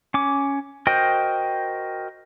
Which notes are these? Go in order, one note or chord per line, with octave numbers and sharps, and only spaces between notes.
C#4 D6
F#4 A#4 C5 D#5 G5